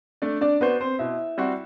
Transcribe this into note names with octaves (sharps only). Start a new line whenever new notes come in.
A3 D4 D5
D4 D5
B3 D4 F#4 B4 C5
C4 C5
B2 E4 E5
G3 C4 F#4